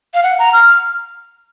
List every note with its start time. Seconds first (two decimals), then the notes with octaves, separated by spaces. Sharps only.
0.14 F5
0.23 F#5
0.39 A#5
0.53 F6